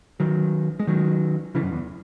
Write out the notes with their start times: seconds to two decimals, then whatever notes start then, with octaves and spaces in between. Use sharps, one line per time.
0.20 D#3 F#3
0.80 G#3
0.87 D#3 F#3
1.55 C#3 E3
1.63 F#2
1.72 E2